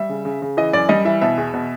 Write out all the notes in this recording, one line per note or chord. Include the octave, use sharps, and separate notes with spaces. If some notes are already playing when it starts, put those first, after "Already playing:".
Already playing: G3 E5
C#3
C#3
C#3
E3 D#5
F#2 D5
G3 D#5
E3 E5
B2 E5
E2
B2